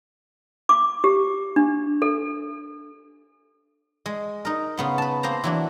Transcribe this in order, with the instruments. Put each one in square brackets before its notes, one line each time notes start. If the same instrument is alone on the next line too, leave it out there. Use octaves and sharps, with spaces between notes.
[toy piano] D6
G4
D4
A4
[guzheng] G#3
D#4 A#4
C#3 B3 C6
B4 A5
A#3 C4 C5 A#5
E3 F#3 D4